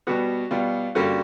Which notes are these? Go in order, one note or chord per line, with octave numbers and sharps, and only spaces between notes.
B2 G3 B3 F#4
B2 G3 B3 F4
G2 D3 G3 A#3 C#4 F#4